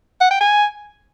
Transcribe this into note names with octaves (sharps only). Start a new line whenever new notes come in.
F#5
G5
G#5